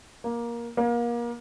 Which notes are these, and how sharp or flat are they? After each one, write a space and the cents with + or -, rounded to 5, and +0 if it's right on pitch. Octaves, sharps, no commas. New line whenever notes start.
A#3 +15
A#3 +30